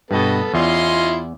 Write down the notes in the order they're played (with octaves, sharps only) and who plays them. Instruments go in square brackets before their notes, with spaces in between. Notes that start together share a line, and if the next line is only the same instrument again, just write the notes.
[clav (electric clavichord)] G2 B2 [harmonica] B3 A4 [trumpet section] F#4 D#5
[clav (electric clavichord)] E2 [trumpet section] C#4 D#5 C6 [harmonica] E4 F4